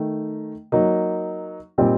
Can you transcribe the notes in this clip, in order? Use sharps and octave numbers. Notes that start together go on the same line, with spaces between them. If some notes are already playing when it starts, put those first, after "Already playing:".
Already playing: D#3 A3 D#4
F#3 A#3 D#4
A#2 G3 C4 D#4